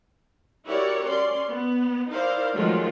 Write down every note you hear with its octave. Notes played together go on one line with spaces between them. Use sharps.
E4 F#4 G4 A#4 C#5 D5
C#4 D5 C6
B3
D#4 E4 A#4 C5 D5 F5
D#3 F3 F#3 G#3 A3 F4